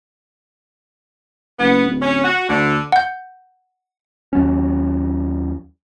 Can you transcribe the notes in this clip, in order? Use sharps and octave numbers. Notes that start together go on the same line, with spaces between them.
F#1 B3
D1
C#4
F#4
D2 D3
F#5 G6
D#2 F#3 C#4